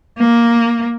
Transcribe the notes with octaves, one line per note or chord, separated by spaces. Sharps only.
A#3